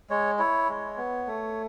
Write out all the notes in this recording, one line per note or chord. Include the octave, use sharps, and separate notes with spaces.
G#3 C#5
E4 C#5
G#3
B3
A3